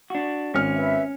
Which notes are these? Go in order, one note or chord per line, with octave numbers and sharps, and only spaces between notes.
D4 F#4
G#1 C#4 F6
B4 E5